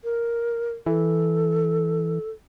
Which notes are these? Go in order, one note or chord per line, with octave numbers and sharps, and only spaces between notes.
A#4
E3 A4